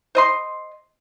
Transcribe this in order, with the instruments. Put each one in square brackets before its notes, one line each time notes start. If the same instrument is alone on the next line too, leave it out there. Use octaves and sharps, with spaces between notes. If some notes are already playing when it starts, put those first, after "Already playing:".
[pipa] C5 D#5 C6